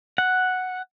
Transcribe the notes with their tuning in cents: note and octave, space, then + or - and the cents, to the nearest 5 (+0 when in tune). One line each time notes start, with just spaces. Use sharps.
F#5 +0